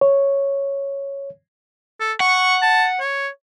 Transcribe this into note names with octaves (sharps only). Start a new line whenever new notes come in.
C#5
A4
F#5 C#6
A5
C#5